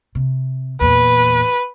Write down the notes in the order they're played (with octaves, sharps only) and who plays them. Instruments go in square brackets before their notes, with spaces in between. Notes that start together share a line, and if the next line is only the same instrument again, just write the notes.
[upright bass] C3
[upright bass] E2 A#2 [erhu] B4